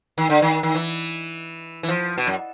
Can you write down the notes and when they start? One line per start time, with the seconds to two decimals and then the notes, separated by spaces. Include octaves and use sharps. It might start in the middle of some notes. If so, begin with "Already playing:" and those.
0.18 D#3
0.30 D3
0.42 D#3
0.63 D#3
0.75 E3
1.83 E3
1.88 F3
2.18 B2
2.27 F#2